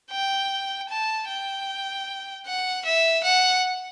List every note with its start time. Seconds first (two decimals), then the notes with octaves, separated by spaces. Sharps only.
0.11 G5
0.90 A5
1.29 G5
2.46 F#5
2.85 E5
3.23 F#5